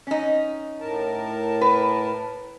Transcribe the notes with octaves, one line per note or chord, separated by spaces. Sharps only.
C#4 D#4
A2 A#4 A5
B4